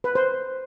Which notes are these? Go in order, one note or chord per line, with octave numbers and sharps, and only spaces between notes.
B4
C5